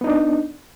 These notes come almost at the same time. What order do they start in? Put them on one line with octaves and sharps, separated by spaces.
B3 D#4 D4